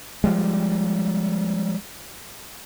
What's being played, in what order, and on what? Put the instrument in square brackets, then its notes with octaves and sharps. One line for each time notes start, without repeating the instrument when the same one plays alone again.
[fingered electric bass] F3 G3 G#3